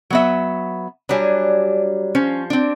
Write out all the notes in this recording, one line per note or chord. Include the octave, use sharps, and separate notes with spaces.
F#3 B3 E5
F#3 G3 D4 G#5
F3 C#4
C4 D4